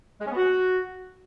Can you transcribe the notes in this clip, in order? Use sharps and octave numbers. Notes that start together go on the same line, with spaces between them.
G#3
C#4
B3
F#4